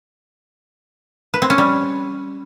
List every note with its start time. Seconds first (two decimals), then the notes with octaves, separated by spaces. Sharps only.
1.34 B4
1.42 C4
1.50 C#4
1.58 G3